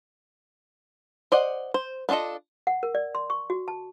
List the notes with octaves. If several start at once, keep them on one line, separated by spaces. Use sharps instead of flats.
C5 D5 D#5 F#5
C5
B3 D4 F4 A4 D#5
F#5
A#4
D5
C6
C#6
F#4
A5